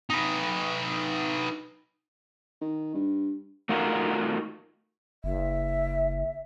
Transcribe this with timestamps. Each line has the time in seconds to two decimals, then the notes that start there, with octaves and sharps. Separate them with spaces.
0.10 D#4 B4
2.61 D#3
2.94 G2
3.69 A3 D#4 F4 F#4 A#4
5.24 F#1 E5